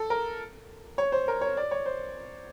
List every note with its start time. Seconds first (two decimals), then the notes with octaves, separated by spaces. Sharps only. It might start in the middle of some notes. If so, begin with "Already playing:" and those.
Already playing: A4
0.10 A#4
0.98 C#5
1.12 C5
1.28 A#4
1.41 C#5
1.57 D5
1.71 C#5
1.86 C5